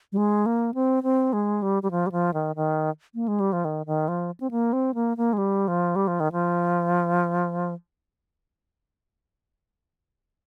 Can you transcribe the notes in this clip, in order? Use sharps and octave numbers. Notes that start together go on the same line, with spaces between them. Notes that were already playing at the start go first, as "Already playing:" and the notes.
G3
G#3
A#3
C4
C4
G#3
G3
G3
F3
G3
F3
D#3
D#3
A#3
G#3
G3
F3
D#3
D#3
F3
C4
A#3
C4
A#3
A#3
G#3
G3
F3
G3
F3
D#3
F3